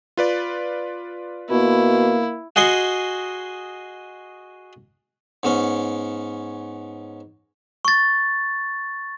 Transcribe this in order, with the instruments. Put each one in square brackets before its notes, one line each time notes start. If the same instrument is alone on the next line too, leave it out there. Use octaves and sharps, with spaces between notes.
[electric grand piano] F4 B4 D5
[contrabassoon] B2 [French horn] A#3 [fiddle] E4
[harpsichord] F#4 G#4 D#5 C6 C#6
G#2 B3 C#4
[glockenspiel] C#6 A6